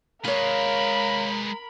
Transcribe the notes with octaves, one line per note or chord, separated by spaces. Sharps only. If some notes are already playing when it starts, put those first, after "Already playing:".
G#3 A#4 B4 C#5 F5 B5